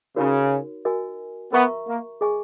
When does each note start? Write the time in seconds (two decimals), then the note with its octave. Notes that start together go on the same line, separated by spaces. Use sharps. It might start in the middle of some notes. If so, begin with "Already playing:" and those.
0.16 C#3 D#4 F#4 A#4 C#5
0.85 F#4 A#4 D#5 G#5
1.52 B3 A#4 E5 A#5 C#6
1.87 A#3
2.21 G#4 D#5 G#5 C#6